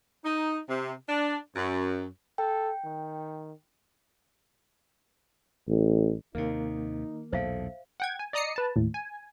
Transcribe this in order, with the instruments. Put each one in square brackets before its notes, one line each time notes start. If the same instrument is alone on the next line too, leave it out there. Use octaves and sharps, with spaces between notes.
[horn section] D#4
C3
D4
F#2
[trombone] A4 [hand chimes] G5
[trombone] D#3
[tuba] A1
[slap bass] D#2 C3 [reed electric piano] D#3 A#3 [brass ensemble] D#4
[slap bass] B1 E2 A#2 [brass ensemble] A4 [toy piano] C5 E5 F5
[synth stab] F#5 G5 G#6
G#5
D5 D#5 A#5 D#6 C7 C#7
B4 A5
D#2 A2
G#5